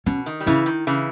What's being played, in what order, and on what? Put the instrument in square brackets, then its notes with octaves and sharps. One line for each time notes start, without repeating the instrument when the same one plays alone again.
[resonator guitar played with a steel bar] B2 [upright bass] C#4
[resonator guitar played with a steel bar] D#3
G3
[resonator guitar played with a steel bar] C#3 E3 [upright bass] E4
[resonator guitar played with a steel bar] D#3
C#3 E3